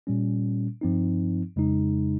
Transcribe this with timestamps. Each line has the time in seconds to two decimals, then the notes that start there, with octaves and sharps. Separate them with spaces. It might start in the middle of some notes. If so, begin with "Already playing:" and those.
0.07 A#2 G3 C#4
0.81 G2 F3 C4 D#4
1.56 F2 C#3 G#3 D#4